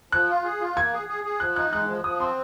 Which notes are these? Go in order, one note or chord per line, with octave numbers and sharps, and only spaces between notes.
F3 F#6
F4
G#4
F4
A#3 G#6
G#4
G#4
G#4
F3 F#6
D#4 F#6
G#3 F#6
F3
F3 D#6
C4 C6